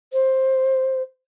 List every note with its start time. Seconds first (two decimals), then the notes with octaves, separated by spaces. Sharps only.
0.13 C5